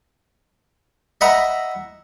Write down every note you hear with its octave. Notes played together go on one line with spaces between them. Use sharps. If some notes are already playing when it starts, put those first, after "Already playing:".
D#5 E5 F#5 A#5 B5